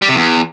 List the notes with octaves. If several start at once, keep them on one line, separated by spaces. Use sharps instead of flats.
G3
C3
E2